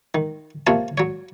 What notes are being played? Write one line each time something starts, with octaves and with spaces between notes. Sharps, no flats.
D#3
C3 F3 A#3 C#5 F5 A5
F#3 C#5